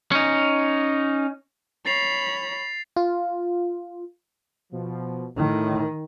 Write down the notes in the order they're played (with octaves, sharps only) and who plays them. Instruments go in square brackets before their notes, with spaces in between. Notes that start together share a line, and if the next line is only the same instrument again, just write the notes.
[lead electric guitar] C#4 D#4
[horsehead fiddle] C#5 B5 [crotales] A6 C7 F7
[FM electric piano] F4
[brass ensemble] B2 F3
[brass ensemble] A2 [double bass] D#3